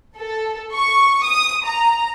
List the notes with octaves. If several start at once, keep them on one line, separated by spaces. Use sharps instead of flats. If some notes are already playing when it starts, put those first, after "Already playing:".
A4
C#6
D#6
A#5